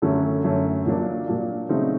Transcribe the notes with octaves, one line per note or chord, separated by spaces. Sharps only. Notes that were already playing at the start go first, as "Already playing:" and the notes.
F#2 D3 F#3 A3 C#4
F#2 D3 F#3 A3 C#4
A#2 F#3 A#3 D4
A#2 F#3 A#3 D4
C#3 F#3 A3 C4 D#4